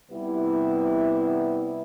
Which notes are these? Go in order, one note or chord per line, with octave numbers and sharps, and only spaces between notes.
C3 G3 B3 E4